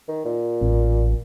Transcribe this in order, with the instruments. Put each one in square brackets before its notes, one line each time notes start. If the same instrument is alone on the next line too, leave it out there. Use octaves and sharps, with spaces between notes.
[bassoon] D#3
A#2
[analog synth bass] A1